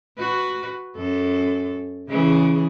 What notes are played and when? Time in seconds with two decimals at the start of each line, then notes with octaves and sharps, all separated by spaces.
0.18 F#4 B4
0.96 F#2 A4
2.08 C#3 E3 G#4